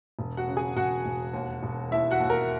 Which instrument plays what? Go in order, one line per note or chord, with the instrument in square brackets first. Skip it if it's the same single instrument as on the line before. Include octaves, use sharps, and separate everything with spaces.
[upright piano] E1
F#4 F#5
C#3
G#4 G#5
E1 F#4 F#5
E1
D#2
E1
D#2 E4 E5
F#4 F#5
D#2
A#4